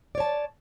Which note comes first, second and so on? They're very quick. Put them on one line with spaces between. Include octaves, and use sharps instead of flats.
D5 C#5 A5